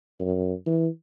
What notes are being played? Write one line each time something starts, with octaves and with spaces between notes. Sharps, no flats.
F#2
E3